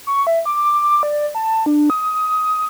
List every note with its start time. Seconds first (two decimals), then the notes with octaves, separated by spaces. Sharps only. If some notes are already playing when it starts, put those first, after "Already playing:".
0.07 C#6
0.27 E5
0.46 D6
1.03 D5
1.35 A5
1.66 D4
1.90 D#6